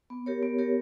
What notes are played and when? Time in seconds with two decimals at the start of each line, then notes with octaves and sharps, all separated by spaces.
0.10 B3
0.26 G4 A#4 C#5
0.43 B3
0.59 G4 A#4 C#5